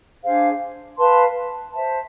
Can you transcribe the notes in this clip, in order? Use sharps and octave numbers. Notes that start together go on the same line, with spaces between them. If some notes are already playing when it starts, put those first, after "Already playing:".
D4 G#4 C5 F5
B4 F5 A5 C6
C5 E5 A5